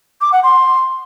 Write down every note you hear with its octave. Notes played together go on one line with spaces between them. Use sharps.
D6
F#5
C6